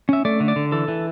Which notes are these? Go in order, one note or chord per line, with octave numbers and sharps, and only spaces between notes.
C#4 E5
A3 D5
D3
D5
D3
E3 A4
E3